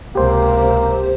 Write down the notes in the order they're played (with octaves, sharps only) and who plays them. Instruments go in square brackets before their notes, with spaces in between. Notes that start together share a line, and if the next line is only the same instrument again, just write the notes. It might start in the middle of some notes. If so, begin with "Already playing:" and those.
[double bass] C#2 C3 [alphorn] A#3 [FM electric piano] G4 C5